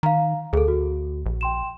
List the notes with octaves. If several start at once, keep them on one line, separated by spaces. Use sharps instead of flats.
D#3 F5 A#5
D2 G#4 A4
F#4
A#1
G5 C6 E7